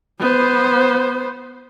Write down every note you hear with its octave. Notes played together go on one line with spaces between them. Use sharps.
B3 C5